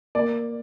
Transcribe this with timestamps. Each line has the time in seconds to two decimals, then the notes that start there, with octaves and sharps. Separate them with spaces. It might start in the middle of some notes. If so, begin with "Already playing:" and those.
0.15 A#3 D5